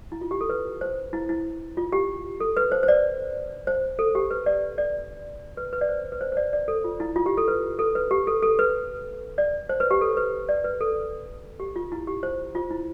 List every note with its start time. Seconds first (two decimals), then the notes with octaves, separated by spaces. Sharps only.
0.12 E4
0.21 F4
0.31 G4
0.41 A4
0.49 B4
0.81 C5
1.13 E4
1.29 E4
1.77 F4
1.92 G4
2.40 A4
2.57 B4
2.72 C5
2.83 C5
2.88 D5
3.67 C5
3.99 A4
4.15 G4
4.31 B4
4.46 D5
4.78 D5
5.57 B4
5.73 B4
5.81 D5
5.89 C5
6.12 B4
6.21 C5
6.32 C5
6.37 D5
6.53 D5
6.68 A4
6.84 F4
7.00 E4
7.16 F4
7.26 G4
7.37 A4
7.48 B4
7.79 A4
7.95 B4
8.11 G4
8.27 A4
8.42 A4
8.59 B4
9.38 D5
9.69 C5
9.80 B4
9.91 G4
10.01 A4
10.17 B4
10.49 D5
10.64 B4
10.81 A4
11.60 G4
11.76 F4
11.92 E4
12.07 G4
12.23 C5
12.55 F4
12.70 E4